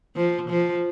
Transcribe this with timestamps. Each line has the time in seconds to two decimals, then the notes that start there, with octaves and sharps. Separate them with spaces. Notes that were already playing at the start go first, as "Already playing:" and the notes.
0.15 F3
0.49 F3